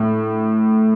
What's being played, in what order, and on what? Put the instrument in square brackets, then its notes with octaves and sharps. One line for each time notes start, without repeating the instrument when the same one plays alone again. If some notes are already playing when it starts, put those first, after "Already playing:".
Already playing: [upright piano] A2